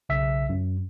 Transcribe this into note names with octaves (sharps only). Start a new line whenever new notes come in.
B1 C#3 E5 E6 B6
F#2